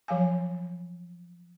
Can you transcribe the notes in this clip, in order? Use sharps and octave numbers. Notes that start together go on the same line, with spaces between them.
F3 F#3 F5 G#5